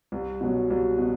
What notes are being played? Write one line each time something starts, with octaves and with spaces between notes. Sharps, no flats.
C2
B2 F#3
C2
B2